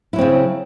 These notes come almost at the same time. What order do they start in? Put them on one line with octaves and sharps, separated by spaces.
E4 F#3 C4 C#3